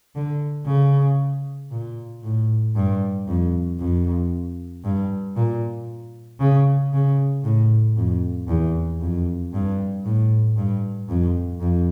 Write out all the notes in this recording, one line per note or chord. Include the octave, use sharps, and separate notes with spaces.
D3
C#3
A#2
A2
G2
F2
F2
G2
A#2
C#3
C#3
A2
F2
E2
F2
G2
A2
G2
F2
F2